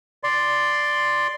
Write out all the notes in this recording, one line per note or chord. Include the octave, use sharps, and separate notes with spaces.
D5 C6